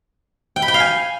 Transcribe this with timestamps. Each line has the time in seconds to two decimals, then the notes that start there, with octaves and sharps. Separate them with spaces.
0.56 G5
0.62 B5
0.68 G5
0.74 F5
0.80 G#5